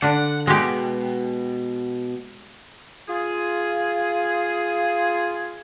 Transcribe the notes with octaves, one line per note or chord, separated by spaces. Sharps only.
D3 D4 F#5
B2 G#3 G4
F4 G#4